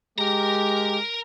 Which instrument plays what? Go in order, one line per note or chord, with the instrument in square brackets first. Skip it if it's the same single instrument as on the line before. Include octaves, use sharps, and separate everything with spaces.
[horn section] G#3 G4 [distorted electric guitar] A#4 A#5